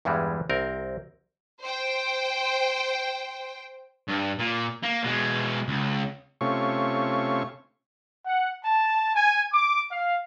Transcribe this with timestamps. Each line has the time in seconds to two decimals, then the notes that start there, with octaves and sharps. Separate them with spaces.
0.05 E2 G2 E3 G3 G#3
0.49 C2 C4 A#4
1.61 C5 G5
4.08 G2
4.39 A#2
4.83 A#3
5.03 B2 G#3
5.68 C#2
6.41 C3 A3 C#4 F4 C#6
8.26 F#5
8.65 A5
9.15 G#5
9.53 D6
9.91 F5